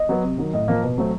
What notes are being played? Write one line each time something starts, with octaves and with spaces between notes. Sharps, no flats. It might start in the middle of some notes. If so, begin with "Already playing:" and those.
Already playing: D#5
F#3 B3
C3
D#3 F#3
A2 D#5
F3 A#3
B2
F#3 A3 C4